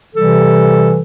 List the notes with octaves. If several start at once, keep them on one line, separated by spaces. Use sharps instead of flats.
C3 E3 G3 A4